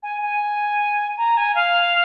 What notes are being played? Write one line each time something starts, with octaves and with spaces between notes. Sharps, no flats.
G#5
G#5
A#5
G#5
F5